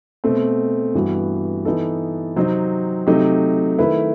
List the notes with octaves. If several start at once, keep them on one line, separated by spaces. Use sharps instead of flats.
B2 A3 C4
G2 E3 G3 B3 F#4
E3 B3 D#4 A4
C3 F#3 C4 D#4
C3 F#3 A3 D#4 G4
D#3 A3 E4 B4